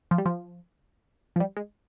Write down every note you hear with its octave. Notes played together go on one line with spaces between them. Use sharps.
F3
G3
F3
F3
G3
G#3